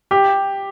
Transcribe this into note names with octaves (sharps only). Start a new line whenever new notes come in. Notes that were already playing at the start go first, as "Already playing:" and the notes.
G4